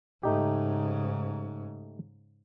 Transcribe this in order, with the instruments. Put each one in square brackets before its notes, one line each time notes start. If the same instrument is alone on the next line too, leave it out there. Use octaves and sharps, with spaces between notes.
[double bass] G#2 C#3 [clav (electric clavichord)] A3 D#4 G4